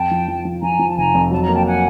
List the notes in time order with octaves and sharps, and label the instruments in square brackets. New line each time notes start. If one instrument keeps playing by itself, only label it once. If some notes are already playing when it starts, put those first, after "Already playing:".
Already playing: [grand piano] F2 [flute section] G5 A5
[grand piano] F3
F3
F3
[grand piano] F3 [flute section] G#5 A#5
[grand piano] F3
[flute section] A5
[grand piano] F1 [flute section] G#5 A#5
[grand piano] F2
[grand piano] F#3 [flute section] A5
[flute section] A#5
[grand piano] A#3
[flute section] G5 A5
F#5 G#5